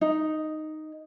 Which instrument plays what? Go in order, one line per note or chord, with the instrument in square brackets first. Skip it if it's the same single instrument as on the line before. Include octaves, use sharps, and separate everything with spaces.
[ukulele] D#4